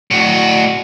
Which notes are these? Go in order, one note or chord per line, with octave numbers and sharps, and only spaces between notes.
A2 F#4